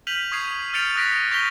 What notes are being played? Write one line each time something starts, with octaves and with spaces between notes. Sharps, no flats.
F6 G6 B6 D#7 F7 F#7
C#6 D#6 G#6 C7 D#7
F6 G6 A6 C#7 D7 F7
D#6 F#6 A#6 B6 D7
C#6 G6 A#6 B6 F7 G7